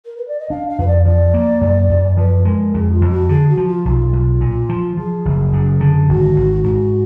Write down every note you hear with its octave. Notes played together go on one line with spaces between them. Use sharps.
A#4
B4
D5
D#5
D4 F5
F5
F2 B4
D5
F3 D5
A#3
F#2
F#2
F3 B4
G#3 A#4
F2 G#4
F4
F2
F#4
D3 G#4
F#4
F3
F4
B1 F4
B1
A#2
F3
F3 G#4
F#1
F#2
D3
G#1 F#4
G#1
G#2 F#4